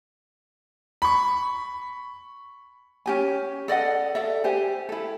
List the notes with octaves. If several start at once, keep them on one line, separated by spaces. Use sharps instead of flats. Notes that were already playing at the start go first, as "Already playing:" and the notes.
B5 C#6
C#4 G4 G#5
A4 D5 D#5 F#5
A4 D5 E5
G4 C5 G#5
E4 A4